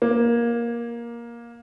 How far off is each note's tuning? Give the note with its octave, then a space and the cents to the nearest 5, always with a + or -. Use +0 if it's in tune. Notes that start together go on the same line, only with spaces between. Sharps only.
A#3 +15